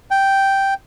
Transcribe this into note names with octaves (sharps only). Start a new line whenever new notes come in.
G5